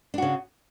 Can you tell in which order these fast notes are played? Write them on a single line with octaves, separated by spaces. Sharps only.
D4 F#4 C#3